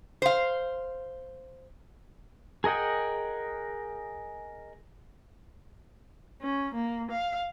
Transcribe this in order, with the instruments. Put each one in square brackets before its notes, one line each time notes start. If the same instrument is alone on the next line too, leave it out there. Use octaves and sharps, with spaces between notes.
[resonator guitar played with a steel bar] C5 F5
[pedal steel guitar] G#4 A#4 D#5 F#5 G5
[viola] C#4
A#3
F5